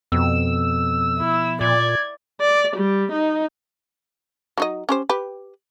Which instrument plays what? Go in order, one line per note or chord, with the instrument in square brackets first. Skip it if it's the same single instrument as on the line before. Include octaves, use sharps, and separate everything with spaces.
[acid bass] F2 [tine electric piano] B2 F3 B3 [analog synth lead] E6
[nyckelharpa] E4
[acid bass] A#2 [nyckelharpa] D5 [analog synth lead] G#6
[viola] D5
G3
D#4
[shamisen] F#3 D#4 D#5
C#4 G4 C5
G4 B4